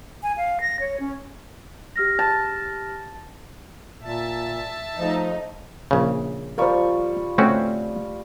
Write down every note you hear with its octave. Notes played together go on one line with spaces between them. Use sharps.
G#5
F5
A#6
C#5
C#4
G4 F6 A#6
A5
A#2 E5 A5
F3 A3 D#4
A#1 C#3
F3 G3 A#4 C5 C#6
A3 C4 C#4 F#4